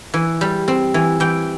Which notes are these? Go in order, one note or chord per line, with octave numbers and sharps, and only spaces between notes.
E3
G3
C4
E3
E3 G5